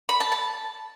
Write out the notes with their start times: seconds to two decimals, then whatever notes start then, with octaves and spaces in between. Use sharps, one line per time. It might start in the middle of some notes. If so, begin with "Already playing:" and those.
0.09 B5
0.20 A5
0.32 A5